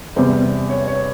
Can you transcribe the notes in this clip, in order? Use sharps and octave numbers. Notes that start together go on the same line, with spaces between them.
E2 C3 G3 C5
C#5
C#5